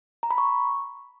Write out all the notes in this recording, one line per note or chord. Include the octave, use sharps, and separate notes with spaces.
A#5
B5
C#6